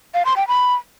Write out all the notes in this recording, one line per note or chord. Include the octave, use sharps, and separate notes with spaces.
F5
C6
G5
B5